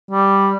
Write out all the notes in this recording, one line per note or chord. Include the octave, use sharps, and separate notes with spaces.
G3